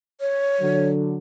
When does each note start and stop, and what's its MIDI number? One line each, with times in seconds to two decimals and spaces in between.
0.21 0.88 73
0.60 1.17 50
0.60 1.17 54